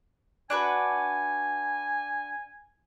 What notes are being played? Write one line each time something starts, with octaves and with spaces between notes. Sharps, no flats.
D4 F#4 B4 G#5